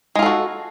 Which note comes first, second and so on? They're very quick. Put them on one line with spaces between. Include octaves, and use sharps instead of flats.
G#3 F4 A4 F#4